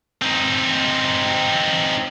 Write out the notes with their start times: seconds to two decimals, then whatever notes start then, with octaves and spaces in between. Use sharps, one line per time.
0.22 C4 D#4